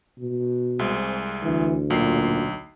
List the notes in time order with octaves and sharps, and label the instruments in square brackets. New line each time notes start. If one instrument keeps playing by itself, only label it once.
[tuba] B2
[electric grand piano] C2 G#3 [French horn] C4
[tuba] D2 [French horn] E3
[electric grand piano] B1 C7 [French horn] A#2